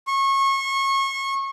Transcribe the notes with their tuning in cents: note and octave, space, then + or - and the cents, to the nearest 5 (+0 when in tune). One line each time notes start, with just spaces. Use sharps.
C#6 -30